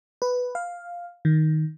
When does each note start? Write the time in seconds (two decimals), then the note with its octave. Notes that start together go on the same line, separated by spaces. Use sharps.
0.22 B4
0.55 F5
1.25 D#3